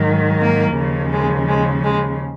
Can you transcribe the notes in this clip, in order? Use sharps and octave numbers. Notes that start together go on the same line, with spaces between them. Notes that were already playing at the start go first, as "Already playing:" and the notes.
Already playing: G#2 D#3 F#3
A#3
D#2 C#3 F3
G#3
G#3
G#3